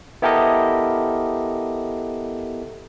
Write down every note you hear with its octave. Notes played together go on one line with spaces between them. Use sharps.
B3 E4 G4 A4 A#4 D#5